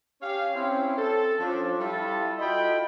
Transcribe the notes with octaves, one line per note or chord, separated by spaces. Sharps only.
C#4 G4 F5
C4 C#4 E4
A4
F3 C#4 D4
G3 E4 F4 G4 A4
F4 F#4 A4 D#5 G5 B5